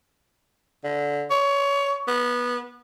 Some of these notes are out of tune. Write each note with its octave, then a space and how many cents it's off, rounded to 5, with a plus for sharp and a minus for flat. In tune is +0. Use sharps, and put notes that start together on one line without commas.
D3 -15
C#5 +20
B3 -15